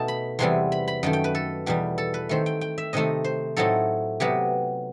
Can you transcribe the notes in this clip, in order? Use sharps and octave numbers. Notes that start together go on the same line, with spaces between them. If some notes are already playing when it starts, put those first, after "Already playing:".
Already playing: B2 A3 D#4 A5
B5
E2 C3 E3 G3 B3 C6
B5
B5
F#2 D#3 A3 G5
G5
B4
A4
E2 B2 G3 G4
A4
B4
D#3 A3 C4 C5
G5
G5
E5
C3 D#3 A3 D#4 D#5
C5
A2 F#3 A3 C4 D#4 A4
C3 F#3 B3 G4